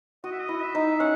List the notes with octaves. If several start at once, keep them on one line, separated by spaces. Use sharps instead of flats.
F#4 D#5
E5
D#5
E4
E5
D#4
C#4 F#5